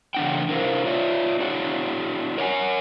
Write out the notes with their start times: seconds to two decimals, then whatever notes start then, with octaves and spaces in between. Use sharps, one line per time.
0.14 C#3 E3 A3 D4 F#5 G5
0.48 C3 D4 E4 A#4 C5 F5
0.85 F4 C#5 D5 E5
1.40 D4 E4 F#4 G#4 C#5
2.37 A#4 C#5 D5 F#5 G#5